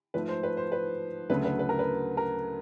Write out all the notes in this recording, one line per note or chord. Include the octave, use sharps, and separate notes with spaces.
G#2 F3 A3 B4
C5
B4
C5
B4
D2 C#3 F#3 A3 B4
B4
B4
A#4
B4
A#4